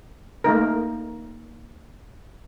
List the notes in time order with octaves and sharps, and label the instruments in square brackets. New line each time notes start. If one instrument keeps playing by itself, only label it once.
[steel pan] A3 A#3 D#4 A#4